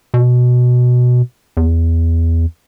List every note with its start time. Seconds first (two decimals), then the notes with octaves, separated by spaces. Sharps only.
0.14 B2
1.57 E2